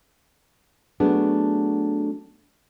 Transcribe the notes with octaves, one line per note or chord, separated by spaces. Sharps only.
F#3 A3 B3 D4 G#4